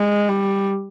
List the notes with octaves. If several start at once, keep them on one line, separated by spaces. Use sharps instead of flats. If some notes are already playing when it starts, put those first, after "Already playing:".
Already playing: G#3
G3